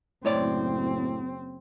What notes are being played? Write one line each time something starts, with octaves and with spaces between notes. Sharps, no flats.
F#1 A2 C4 C#5 D5